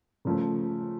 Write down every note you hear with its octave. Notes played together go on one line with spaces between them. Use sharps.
C#3 F3 A3